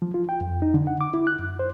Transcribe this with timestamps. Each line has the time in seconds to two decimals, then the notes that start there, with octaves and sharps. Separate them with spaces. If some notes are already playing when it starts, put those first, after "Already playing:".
0.02 F3
0.14 F4
0.29 G5
0.41 F2
0.62 D#4
0.74 D3
0.87 F#5
1.01 D6
1.14 E4
1.27 F#6
1.39 F#2
1.59 C5